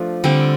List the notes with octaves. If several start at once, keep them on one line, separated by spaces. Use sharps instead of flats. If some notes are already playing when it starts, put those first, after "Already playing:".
Already playing: F3 A3 D4 F4
D3 G3 C4